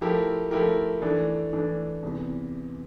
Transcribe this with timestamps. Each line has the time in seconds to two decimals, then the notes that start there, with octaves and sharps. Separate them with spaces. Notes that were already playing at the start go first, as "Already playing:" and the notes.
0.01 F3 A3 E4 G4 A#4
0.51 F3 A3 E4 G4 A#4
1.02 E3 A3 D4
1.53 E3 A3 D4
2.03 E2 C3 E3